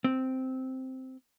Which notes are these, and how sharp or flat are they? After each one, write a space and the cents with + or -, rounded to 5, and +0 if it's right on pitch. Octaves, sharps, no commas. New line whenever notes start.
C4 -5